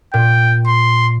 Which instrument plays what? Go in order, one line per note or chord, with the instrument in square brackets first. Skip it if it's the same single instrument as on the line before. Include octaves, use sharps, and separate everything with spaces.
[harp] A#2 [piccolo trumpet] G5
[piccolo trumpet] C6